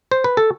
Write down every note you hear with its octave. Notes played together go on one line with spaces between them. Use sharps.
C5
B4
A4